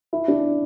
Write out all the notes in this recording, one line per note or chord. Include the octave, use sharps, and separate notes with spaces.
E4
D4